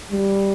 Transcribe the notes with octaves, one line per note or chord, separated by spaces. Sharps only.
G3